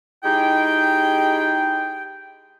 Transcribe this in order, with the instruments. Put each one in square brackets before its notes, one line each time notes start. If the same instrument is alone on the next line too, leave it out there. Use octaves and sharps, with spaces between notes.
[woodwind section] G#3 D#4 E4 G4 G#4 G5